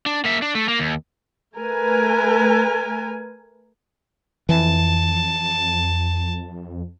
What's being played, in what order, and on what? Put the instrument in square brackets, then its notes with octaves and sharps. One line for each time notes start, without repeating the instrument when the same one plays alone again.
[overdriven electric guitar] D4
A#3 E5
D4
A3
A#3
D#2
[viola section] A3 A#4 B4 G#5
[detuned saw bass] F2 [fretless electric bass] E3 [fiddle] A5